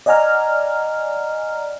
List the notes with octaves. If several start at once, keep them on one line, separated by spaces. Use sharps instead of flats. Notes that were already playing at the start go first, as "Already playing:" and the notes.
D5 D#5 F#5 G#5 A#5 F6